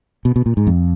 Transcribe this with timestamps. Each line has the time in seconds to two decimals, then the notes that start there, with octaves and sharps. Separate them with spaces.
0.25 B2
0.36 B2
0.46 A#2
0.57 G#2
0.67 F2